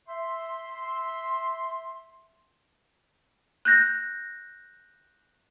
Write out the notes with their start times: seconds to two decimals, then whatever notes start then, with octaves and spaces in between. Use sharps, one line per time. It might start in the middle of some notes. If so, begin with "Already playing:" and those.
0.08 E5 C6
3.65 F#6 G6 A#6